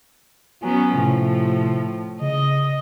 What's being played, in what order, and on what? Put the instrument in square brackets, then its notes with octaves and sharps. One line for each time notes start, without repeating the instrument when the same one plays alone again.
[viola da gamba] F#3 B3 C#4 [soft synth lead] G#5
[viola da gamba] A2 F3 [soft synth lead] C3
[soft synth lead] C#3 [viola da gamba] D#5